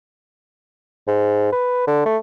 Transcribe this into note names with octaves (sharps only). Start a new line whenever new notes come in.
G#2
B4
D3
A3